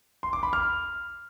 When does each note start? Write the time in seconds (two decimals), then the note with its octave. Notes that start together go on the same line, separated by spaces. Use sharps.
0.23 C6
0.33 D6
0.43 B5
0.53 F6